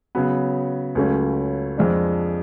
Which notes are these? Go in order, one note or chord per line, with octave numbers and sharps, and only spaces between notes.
C#3 F#3 B3
C#2 C#3 F#3 A3 C#4
F2 F3 G#3 D4